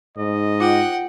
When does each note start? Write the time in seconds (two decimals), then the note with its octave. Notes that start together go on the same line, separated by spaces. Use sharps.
0.17 G#2 D#5
0.60 F4 F#5 G5